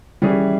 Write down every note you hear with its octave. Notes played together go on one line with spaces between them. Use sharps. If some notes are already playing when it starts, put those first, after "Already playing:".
E3 G3 C#4 G#4